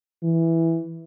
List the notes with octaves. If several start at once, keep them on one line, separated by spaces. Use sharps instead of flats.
E3